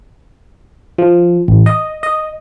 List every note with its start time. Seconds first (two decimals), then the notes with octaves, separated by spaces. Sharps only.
0.98 F3
1.48 A1
1.66 D#5
2.03 D#5